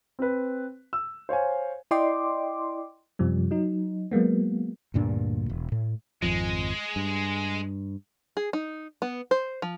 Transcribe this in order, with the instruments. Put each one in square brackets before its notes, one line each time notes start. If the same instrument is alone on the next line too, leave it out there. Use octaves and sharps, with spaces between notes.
[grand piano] C4 B4
E6
C5 C#5 F5 G#5
[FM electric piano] E4 D5 D#5 G5 C6 D6
F#2 C3 F3 G3
F#3 D#4
F#3 G#3 A#3 B3
[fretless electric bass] D2 G2 A#2 D4
E1
A2
[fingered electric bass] G#1 F2 F3 [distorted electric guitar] G#3
[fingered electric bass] G2
[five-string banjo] G#4
D#4
B3
C5
F3